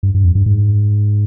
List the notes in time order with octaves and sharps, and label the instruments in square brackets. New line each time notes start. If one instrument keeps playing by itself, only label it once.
[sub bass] G2
G2
F2
G2
G#2